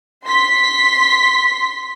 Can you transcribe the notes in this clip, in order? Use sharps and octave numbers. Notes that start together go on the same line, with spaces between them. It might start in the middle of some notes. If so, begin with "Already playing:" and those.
C6 B6